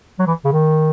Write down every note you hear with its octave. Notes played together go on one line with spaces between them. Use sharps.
F#3
E3
C#3
D#3